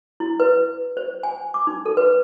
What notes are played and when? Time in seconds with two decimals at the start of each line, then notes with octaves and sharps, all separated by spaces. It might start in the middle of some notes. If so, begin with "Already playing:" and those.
0.20 E4
0.40 B4
0.97 C5
1.23 G#5
1.54 D6
1.67 D#4
1.86 A4
1.97 B4